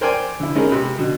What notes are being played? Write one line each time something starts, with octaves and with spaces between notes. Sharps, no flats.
A#4 C5 D5 G5 G#5
D3 E4
G#3 C#4 D#4 E4 G#4 A#4
C3 B5
B2 D3